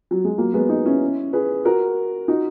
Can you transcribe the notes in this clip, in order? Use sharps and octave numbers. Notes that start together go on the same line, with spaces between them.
F#3
G#3
F#3 A#3
G#3 B3
B3 D#4
C#4 E4
G#4 B4
F#4 A#4
D#4 F#4